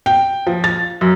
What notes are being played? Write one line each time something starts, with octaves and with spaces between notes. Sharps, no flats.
G5
F3
A6
F#2